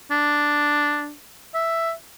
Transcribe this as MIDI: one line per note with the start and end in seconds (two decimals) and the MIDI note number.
0.10 1.12 62
1.54 1.92 76